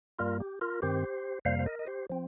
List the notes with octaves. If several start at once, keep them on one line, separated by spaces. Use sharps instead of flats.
G2 G3 A#3 F4 A#4
G4
F4 A#4
G2 D#3 C4 G4 C5
F2 C3 G3 A#3 C5 F5
C5
A#4 D#5
D#5
G4 C5
F3 C4